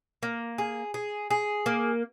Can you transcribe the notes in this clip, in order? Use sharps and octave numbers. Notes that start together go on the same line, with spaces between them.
A#3
G#4
G#4
G#4
A#3